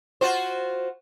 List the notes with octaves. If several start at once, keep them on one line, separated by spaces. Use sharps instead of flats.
F4 F#4 C5